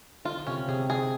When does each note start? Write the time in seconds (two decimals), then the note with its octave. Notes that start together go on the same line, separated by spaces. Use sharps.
0.25 D3 F4
0.47 C3 C#4
0.68 C3 G#4
0.90 G#4